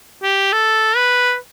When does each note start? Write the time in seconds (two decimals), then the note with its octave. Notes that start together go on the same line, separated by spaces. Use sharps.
0.23 G4
0.53 A4
0.96 B4